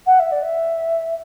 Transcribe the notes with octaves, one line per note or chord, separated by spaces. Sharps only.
F#5
E5
D5
E5